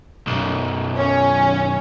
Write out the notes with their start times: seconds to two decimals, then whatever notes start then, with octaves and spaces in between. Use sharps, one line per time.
0.27 B1 F#2
0.96 C#4